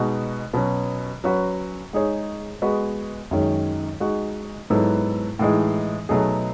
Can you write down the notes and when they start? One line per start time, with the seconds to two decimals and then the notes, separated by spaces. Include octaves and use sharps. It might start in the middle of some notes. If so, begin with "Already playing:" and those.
Already playing: B2 G#3 D#4 F#4
0.53 B2 F#3 C#4
1.24 F#3 C#4 F#4 B4
1.93 G#3 D#4 G#4 C#5
2.62 G#3 B3 F#4 B4 D#5
3.31 F#2 D#3 G#3 C#4
4.00 G#3 D#4 F#4
4.70 G#2 F#3 B3 E4 A4
5.39 A2 E3 G#3 D#4
6.09 B2 F#3 A3 D#4 G#4